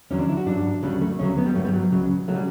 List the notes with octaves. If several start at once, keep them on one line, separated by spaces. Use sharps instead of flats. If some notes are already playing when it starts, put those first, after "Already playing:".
E2 D3 F#3 C#4
D4
E4
F#4
G2 F#3 D4
D2 C#3 F#3 G3
A3
D2 C#3 F#3 C#4
B3
G3
G2 F#3 A3
G3
F#3
C#2 C#3 F#3
C#3 F#3 A3
G3